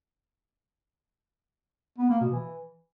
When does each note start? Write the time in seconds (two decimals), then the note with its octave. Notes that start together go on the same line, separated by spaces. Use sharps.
1.98 B3
2.09 A#3
2.21 B2
2.32 E3